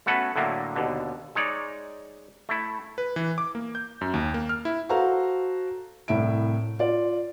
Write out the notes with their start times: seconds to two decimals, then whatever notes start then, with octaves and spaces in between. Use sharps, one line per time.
0.06 A3 B3 C#4 F#4 A4 B4
0.36 A2 D3 F#3 A3 A#3
0.76 D#2 B2 D3
1.35 G#3 D#4 C#5 D5
2.49 A3 E4
2.98 B4
3.16 E3
3.38 D6
3.55 A#3
3.75 G6
4.01 F#2
4.14 D#2
4.34 A#3
4.49 F6
4.65 E4
4.89 F#4 A4 C5 F5 A#5
6.08 C2 A2 E4 E5 D7
6.79 F4 D5